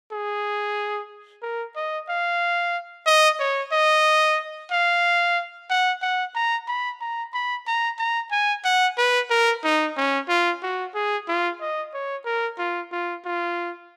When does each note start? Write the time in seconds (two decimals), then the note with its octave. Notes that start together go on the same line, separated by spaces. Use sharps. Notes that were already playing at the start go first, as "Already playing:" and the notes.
0.12 G#4
1.42 A#4
1.76 D#5
2.09 F5
3.06 D#5
3.40 C#5
3.72 D#5
4.71 F5
5.70 F#5
6.02 F#5
6.35 A#5
6.68 B5
7.01 A#5
7.33 B5
7.67 A#5
7.99 A#5
8.31 G#5
8.65 F#5
8.98 B4
9.30 A#4
9.64 D#4
9.97 C#4
10.28 F4
10.62 F#4
10.94 G#4
11.28 F4
11.61 D#5
11.94 C#5
12.25 A#4
12.58 F4
12.92 F4
13.25 F4